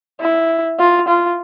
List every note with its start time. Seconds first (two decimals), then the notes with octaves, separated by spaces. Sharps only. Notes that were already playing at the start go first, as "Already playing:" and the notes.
0.21 E4
0.79 F4
1.08 F4